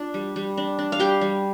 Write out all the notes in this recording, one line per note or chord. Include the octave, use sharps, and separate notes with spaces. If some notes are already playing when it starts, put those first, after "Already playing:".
Already playing: D4 F4
G3
G3
D4
D4
F5
G3 G4 G5
G3